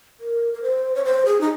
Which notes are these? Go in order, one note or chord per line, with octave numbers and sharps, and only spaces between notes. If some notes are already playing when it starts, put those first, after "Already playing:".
A#4
A#4
C5
C#5
C5
G#4
D#4